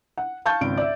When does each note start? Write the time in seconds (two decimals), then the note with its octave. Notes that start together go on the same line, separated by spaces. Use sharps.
0.18 F#5
0.46 F5 A5 C#6 G6 A6
0.61 G#1 C#2 D7
0.77 D5 E5